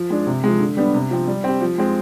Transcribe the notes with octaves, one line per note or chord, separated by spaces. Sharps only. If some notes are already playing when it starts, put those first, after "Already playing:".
Already playing: F3
G#3 D4
C3
F3 G#3
D3
G3 B3 D4
C3
F3 C4
G3
C4 G4
F3
G#3 C4